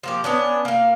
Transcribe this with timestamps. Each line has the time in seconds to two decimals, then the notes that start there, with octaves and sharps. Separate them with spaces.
0.03 F3 A#3 G4
0.24 B3 C#4 D4
0.65 A#3 F5